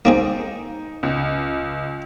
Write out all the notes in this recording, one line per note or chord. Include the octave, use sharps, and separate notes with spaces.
A#3 C4 D#4 G#4
C#2